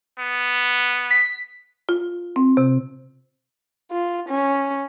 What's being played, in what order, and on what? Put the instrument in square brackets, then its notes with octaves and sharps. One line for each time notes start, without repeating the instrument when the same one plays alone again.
[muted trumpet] B3
[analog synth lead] B6
[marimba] F4
C4
C3
[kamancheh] F4
C#4